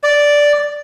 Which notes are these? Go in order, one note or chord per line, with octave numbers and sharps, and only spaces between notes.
D5